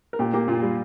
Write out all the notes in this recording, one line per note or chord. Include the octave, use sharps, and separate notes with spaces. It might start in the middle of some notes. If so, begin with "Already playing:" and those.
A#4
A#2 G4
A#3 G4
A#2 F4
G3